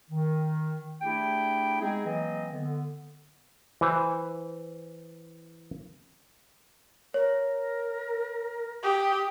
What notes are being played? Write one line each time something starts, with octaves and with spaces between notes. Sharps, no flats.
D#3
A3 D4 E4 G4 G#4 G5
G#3 B3 C4 D#4 G#4
E3 F#3 A#3 C4 D#5
D3 B3
E3 C5
A#4 C#5
G4 D#6